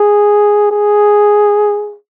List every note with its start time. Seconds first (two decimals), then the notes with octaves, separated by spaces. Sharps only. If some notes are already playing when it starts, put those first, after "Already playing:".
Already playing: G#4
0.71 G#4